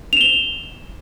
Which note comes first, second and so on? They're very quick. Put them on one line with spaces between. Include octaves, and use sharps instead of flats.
F7 E7 G7